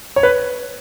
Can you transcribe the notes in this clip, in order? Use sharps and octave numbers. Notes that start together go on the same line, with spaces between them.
C#5
B4